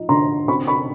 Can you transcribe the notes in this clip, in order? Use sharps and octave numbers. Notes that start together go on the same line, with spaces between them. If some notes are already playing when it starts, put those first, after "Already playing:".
Already playing: F3 D#4
D3 A#5 C6
C4 B5 C#6
B5 C#6